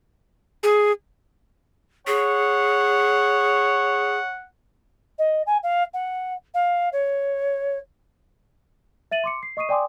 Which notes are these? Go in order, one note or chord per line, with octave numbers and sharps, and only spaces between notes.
G#4
G#4 C#5 F#5
D#5
G#5
F5
F#5
F5
C#5
E5 A6 D#7 F#7
C6 D6 C#7
C7
D#5 C#6 D#6 C7 D#7
D5 G5 G#5 C6 D6 D#6